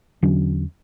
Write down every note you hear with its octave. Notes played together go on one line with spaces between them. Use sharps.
E2 D3 F#3 C#4